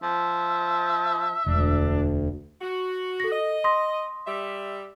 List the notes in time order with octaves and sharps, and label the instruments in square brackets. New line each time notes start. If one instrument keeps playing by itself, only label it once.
[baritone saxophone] F3 [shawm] E5
[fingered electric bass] E1 [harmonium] D2 [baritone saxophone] D4
[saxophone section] F#4
[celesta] A4 A#6
[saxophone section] D#5
[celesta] C6 D#6 A#6
[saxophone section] G3 E5